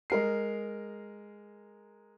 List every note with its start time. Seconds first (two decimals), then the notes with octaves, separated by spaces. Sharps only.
0.10 G#3 A#4 C7